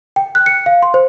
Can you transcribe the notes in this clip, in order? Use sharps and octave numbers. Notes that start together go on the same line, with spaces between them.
G5
F#6
C#7
F5
C6
C5